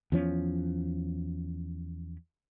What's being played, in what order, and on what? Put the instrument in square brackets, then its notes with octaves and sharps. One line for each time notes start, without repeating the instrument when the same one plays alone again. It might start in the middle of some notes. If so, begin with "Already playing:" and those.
[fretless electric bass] E2 F3 C#4